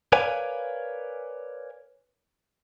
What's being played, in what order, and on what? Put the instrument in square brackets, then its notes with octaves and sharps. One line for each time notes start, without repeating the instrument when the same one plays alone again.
[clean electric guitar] A#4 B4 C#5 D5 F5 G#5